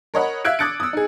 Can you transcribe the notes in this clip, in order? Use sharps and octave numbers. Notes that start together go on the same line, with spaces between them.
A#4 C#5 D#5 F#5 B5
E5 F5 E6 F#6 G#6 D7
D6 D#6 F#6 A6 C#7 D7
D#6 E6
D#4 G#4